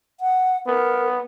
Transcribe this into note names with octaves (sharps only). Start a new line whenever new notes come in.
F#5
B3 A#4